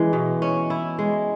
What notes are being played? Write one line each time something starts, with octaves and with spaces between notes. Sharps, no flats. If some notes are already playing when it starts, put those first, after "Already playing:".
Already playing: E3 G#3 C#4 E4
B2
C#4
E4
G#3